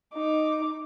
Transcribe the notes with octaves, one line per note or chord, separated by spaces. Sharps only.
D#4 D6